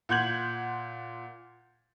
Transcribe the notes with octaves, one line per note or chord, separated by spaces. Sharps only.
A#2 F#5 C6 G6 G#6 F#7